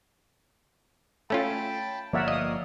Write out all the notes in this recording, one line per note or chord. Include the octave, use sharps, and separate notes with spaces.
A3 C#4 F4 G5 A5 B5
G1 F3 A#3 A#4 C#5 D5 E5 F#5
D#5 F5 D#6